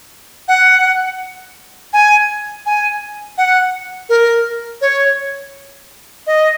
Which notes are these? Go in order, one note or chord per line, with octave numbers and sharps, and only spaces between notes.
F#5
G#5
G#5
F#5
A#4
C#5
D#5